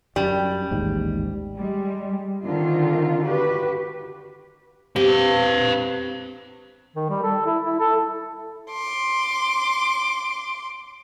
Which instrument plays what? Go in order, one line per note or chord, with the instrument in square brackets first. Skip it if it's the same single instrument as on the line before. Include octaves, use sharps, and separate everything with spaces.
[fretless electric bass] F#2 [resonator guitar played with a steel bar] G3
[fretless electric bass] A1 D#2 G#2
[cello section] G3 G#3
D3 D#3 C4 F4
F#4 G4 B4
[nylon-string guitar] B3 C4 G4 [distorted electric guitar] B4 F5
[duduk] D#3
G3
A4
E4
E4
A4
[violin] C6 D6